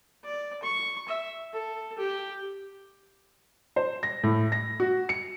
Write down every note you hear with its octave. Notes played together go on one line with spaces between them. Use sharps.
D5
C#6
E5
A4
G4
C5
A#6
A2
A#6
F#4
C#7